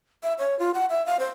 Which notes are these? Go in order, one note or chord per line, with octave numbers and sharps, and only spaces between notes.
E5
C#5
F4
F#5
E5
F5
C5